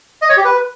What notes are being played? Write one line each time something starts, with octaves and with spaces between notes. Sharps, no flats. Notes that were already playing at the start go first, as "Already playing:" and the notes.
D#5
C#5
G4
B4